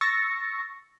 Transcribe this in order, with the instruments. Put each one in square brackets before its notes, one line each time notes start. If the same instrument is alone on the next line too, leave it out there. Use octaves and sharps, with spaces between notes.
[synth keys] C#6 E6 A6 A#6 C#7